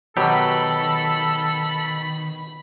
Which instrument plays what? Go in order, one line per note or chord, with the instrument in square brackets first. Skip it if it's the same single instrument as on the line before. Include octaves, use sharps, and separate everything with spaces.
[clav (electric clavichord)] B2 F#3 G4 [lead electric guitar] D#3 [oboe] A4 [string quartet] B5